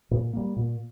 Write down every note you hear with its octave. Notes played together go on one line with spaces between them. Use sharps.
A#2
G3 A#3
A#2